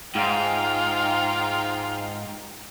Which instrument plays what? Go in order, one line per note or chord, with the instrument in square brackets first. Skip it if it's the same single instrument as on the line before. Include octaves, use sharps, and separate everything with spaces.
[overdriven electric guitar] G#2 [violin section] D#4 F4 G5 [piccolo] F5